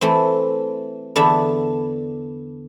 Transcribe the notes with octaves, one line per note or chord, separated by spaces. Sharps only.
E3 A3 C4
E2 D3 B3 D4 E5 B5